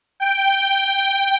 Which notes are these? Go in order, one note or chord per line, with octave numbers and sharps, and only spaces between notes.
G5
G5